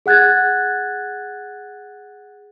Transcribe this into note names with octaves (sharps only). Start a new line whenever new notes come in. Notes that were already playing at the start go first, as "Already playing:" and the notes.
G#4 F#5 F#6 G#6 A6